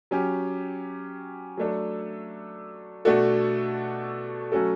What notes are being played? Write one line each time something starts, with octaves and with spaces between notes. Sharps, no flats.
F#3 C#4 G4
F#3 A3 D4 A4
B2 A3 D4 F#4 A4
F#3 A3 C#4 F#4 A4